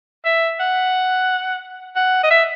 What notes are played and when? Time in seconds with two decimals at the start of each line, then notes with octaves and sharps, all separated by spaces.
0.25 E5
0.60 F#5
1.96 F#5
2.23 D#5
2.30 E5